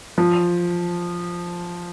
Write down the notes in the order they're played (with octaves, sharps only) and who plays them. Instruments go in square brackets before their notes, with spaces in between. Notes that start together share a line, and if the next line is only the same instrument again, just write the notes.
[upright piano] F3